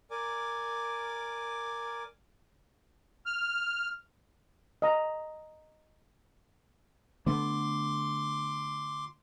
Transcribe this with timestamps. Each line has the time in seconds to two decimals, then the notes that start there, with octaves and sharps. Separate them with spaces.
0.11 A#4 D5 G#5 D6
3.26 F6
4.82 D#5 A#5
7.26 D3 A3 B3 C6 D6